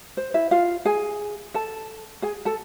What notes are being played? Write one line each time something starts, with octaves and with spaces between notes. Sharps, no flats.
C5
E4 E5
F4 F5
G#4 G#5
A4 A5
G#4 G#5
A4 A5